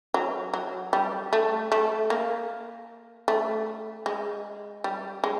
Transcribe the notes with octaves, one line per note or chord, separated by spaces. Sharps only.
F#3
F#3
G3
A3
A3
A#3
A3
G#3
G3
G#3